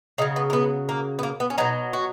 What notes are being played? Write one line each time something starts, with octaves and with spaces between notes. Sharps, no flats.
C#3 F#3 D#4
B3
A#3
B3
A#3
B3
A#3
B3
C#4
B2 F#3 D#4
F#4